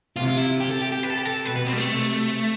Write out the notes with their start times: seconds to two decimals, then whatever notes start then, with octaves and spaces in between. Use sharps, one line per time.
0.16 C3 F4
0.27 F4
0.37 E4
0.60 G4
0.71 A4
0.82 G4
0.92 G4
1.03 B4
1.10 A4
1.18 G4
1.25 A4
1.45 B2 B4
1.56 B4
1.67 C4
1.73 G3
1.77 A3
1.88 C3